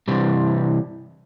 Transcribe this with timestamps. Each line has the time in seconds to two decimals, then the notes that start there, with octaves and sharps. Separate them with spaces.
0.08 C3 E3 G3